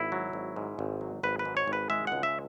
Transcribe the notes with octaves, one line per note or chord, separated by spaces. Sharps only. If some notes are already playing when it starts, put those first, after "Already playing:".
Already playing: G#1 E4
F#3
G#1
G#2
G#1
F#3
G#1 B4
B4
G#2
C#5
G#1
B4
G#3 E5
C#2 F#5
E5